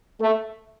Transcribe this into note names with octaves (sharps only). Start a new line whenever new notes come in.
A3